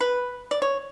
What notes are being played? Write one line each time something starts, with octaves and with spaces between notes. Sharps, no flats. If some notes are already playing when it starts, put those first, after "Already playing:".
B4
D5
C#5